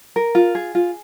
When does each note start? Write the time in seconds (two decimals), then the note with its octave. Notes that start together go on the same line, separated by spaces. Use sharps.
0.16 A#4
0.35 F4
0.55 G#4
0.75 F4